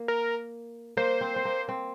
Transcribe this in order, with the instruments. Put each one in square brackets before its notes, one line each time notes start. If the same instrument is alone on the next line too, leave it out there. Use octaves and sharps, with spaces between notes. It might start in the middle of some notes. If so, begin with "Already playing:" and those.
Already playing: [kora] A#3
[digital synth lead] A#4
[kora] A#3 [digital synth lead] C5
[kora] C4
C4
A#3
C4